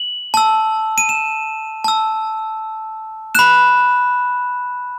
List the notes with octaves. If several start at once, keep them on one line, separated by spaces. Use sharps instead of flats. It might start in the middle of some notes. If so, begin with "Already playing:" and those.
Already playing: F#7
A5 E6
D#7
E7
A5 E6
B5 F#6 E7